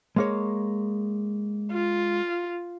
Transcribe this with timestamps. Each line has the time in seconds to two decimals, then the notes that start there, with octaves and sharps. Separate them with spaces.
0.16 G#3 A#3 C#5
1.72 F4